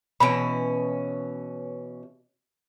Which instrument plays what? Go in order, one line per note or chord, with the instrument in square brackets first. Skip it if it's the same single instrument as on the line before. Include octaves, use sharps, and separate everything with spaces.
[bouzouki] B2 E3 C#4 [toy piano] G#5 B5